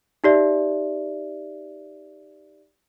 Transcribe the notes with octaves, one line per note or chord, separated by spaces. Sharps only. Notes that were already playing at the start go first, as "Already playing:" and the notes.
D#4 G4 D5 E5